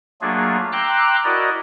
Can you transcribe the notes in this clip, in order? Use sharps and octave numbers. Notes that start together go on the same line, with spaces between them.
F#3 A3 A#3 D4 F4 G#4
G5 A#5 C6 D6 E6 F#6
E4 F#4 A#4 D5 D#5